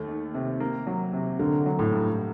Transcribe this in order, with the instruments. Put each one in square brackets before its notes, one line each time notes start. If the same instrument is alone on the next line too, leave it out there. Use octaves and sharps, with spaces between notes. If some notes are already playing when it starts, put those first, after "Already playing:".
Already playing: [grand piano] D#2 A3
D#3
C3
A#3
F#3
C3
[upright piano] D3 [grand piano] A#3
[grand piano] F#3
[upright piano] A2
[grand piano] G2